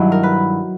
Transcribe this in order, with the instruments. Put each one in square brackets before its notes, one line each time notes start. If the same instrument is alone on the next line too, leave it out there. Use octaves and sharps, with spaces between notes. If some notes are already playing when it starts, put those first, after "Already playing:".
Already playing: [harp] G2 D#3 F#3 E4
A#4
B4